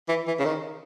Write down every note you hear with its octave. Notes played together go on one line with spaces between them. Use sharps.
E3
E3
C#3
D#3